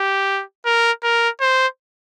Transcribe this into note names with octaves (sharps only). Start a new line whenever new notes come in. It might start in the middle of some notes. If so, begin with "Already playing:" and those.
Already playing: G4
A#4
A#4
C5